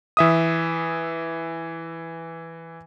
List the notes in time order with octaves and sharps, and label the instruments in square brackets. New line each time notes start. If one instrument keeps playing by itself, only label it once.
[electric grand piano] E3 E5 D#6